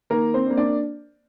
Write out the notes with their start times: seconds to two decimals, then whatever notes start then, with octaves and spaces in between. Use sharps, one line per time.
0.10 D#3 A#3 A#4
0.34 C4 C5
0.46 D4
0.50 A#3
0.57 D4 D5